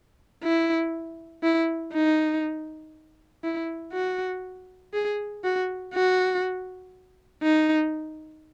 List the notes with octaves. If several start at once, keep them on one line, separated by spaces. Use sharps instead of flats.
E4
E4
D#4
E4
F#4
G#4
F#4
F#4
D#4